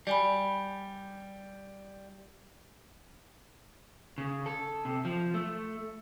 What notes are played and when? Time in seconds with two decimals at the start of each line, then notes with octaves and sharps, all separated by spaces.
0.07 G3 D5 G#5 B5
4.18 C#3
4.46 A4
4.85 C3
5.05 F3
5.34 A3